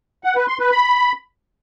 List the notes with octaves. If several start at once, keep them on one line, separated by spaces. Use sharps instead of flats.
F#5
B4
C6
B4
B5